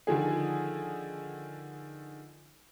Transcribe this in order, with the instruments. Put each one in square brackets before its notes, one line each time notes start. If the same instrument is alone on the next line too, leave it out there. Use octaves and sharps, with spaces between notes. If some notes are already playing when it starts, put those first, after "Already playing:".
[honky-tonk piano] D3 D#3 F3 G#4